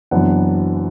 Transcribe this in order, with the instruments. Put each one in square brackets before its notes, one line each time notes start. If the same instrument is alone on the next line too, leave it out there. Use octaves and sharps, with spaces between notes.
[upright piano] F#1 F#2 E3 B3 D4 F#5